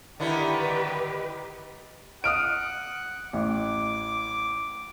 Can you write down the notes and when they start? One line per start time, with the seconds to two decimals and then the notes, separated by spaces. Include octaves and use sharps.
0.20 D3 D#3 E4 G4 B4
2.24 F#5 D#6 F6 D7
3.33 A1 D6